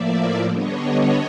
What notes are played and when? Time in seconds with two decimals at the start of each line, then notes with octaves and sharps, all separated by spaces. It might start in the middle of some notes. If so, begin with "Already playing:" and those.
Already playing: A2 F3 A#3 D5 E5
0.47 D3 G3 B3 D4 C#5 D#5